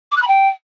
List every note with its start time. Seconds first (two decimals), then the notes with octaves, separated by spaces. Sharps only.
0.11 D6
0.16 F#6
0.22 B5
0.27 G5